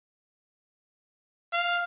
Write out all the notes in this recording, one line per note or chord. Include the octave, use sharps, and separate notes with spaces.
F5